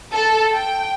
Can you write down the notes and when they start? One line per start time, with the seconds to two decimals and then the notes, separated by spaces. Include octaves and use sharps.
0.13 A4
0.54 G5